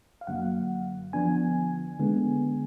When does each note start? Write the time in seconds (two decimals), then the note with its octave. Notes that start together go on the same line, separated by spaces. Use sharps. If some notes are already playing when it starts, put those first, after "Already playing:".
0.21 F5
0.27 F#2 D3 F#3 A#3 F#5
1.13 D3 F3 B3 D4 G#5
1.99 D3 G#3 B3